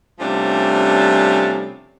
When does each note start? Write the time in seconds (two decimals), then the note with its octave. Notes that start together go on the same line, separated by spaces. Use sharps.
0.20 C3 F3 G3 A3 C#4 D4